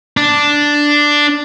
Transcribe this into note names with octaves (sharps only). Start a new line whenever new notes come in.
D4